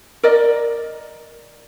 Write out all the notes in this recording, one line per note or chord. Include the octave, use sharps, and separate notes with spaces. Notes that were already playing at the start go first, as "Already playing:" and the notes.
A#4 D5 D#5